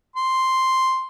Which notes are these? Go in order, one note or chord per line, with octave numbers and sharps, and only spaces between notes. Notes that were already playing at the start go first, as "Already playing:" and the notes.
C6